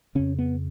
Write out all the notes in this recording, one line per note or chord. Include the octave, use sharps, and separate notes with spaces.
F2 C#3 C#4
B3